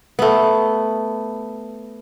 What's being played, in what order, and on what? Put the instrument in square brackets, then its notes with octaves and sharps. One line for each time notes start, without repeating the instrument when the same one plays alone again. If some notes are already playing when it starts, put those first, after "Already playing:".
[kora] A3 B3